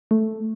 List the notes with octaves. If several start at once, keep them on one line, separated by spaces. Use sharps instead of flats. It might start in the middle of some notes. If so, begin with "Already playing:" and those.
A3